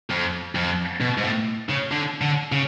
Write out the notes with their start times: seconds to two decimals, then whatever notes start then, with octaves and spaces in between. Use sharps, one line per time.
0.10 F2
0.55 F2
1.00 B2
1.18 G#2
1.23 A2
1.69 C#3
1.91 D3
2.21 D3
2.52 C#3